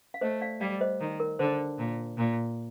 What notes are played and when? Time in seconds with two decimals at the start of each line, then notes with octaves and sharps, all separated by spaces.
0.14 F5
0.21 A3 C5 D#5
0.41 D5 F5
0.60 G3 D5 F5
0.81 C5 D#5
1.00 D#3
1.20 A#4
1.39 D3 C5
1.78 A#2
2.17 A#2